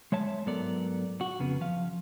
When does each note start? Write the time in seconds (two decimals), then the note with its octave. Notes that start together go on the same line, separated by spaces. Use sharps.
0.12 G#3 C#5 E5 A5
0.46 G#2 F#3 B3 A4 A#4 D5
1.21 F#4
1.39 F2 C#3 B3
1.61 F3 F5